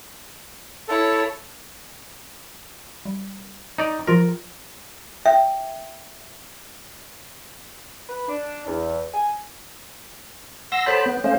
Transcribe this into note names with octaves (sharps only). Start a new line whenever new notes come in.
E4 A4 C#5
G3
D#4 D5
F3 F4 A#4 A#6
E5 G5
B4
D4
E2
G#5
F#5 C6 E6 A#6
A4 C5 C#5 A5 B5 G6
B3
A3 C#4 C5 F5